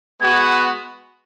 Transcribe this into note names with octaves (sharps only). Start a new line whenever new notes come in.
G#3 B3 F#4 B4 G#6